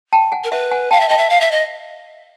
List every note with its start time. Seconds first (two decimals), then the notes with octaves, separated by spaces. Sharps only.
0.13 G5 A5
0.32 F#5 G#5
0.44 A#4
0.51 B4 E5 F#5
0.71 F#5 G#5
0.91 F5 G5 A5
1.00 E5
1.09 D#5 G5 A5
1.18 E5
1.30 F5
1.41 E5
1.51 D#5